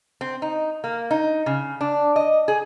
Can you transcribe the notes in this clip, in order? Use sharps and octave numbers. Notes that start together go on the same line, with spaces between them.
C4
D#4
A#3
D#4
C#3
D4
D#5
G#4